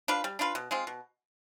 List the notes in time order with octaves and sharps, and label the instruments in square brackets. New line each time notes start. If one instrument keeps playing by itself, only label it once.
[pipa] D4 F4 B4
G3
D4 F4 B4
B2
G#3 C4 F4
B2